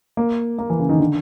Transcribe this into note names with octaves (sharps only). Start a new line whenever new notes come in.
A#3
A#3
E3
C#3
D#3
D3